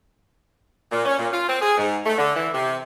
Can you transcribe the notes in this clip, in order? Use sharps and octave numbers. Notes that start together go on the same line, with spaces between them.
A#2
C#4
A#2
F4
C4
G#4
G#2
A3
D3
E3
C3